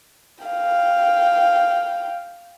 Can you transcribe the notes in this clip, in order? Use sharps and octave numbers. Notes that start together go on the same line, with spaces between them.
F5 G5